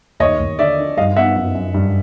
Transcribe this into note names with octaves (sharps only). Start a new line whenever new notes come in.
D#2 C#5 D#5
D#2
D3 D5 E5
D4
G2 D#5 F5
B3 E5 F#5
F#2
F#2
G2